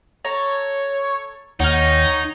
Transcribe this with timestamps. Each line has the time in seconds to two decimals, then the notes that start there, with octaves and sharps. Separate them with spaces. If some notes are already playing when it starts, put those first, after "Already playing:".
0.25 A4 C#5 A#5
1.60 D#2 D#4 C#5 F#5 G5 F6